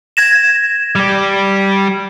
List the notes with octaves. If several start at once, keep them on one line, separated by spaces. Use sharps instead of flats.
G#6 A#6 E7
G3 G4